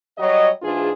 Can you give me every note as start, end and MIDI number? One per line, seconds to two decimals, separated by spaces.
0.18 0.49 54
0.18 0.49 55
0.18 0.49 73
0.18 0.49 75
0.62 0.90 44
0.62 0.90 52
0.62 0.90 62
0.62 0.90 65
0.62 0.90 68